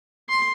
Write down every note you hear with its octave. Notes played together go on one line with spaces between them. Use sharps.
C6